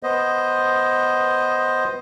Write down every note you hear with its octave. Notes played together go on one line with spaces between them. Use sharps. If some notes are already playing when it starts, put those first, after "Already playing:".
B3 C5 D#5